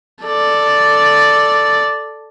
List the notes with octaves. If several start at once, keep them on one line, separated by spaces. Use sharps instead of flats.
A4 D5